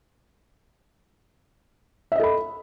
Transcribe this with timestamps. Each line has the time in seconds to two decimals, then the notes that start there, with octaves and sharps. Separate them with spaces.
2.12 E5
2.16 D#5
2.19 A4
2.23 B5